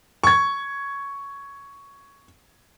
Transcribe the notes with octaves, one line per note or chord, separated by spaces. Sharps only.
C#6 G#6